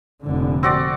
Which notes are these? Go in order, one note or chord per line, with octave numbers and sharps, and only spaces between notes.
F1 A#2 D3
C4 F#4 D5